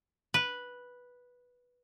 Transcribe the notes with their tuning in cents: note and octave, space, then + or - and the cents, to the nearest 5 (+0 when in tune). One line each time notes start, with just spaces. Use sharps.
B4 -5